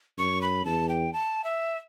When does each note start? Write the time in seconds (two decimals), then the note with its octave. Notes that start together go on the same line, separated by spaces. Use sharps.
0.18 F#2 C#6
0.42 B5
0.65 E2 A5
0.89 G5
1.13 A5
1.44 E5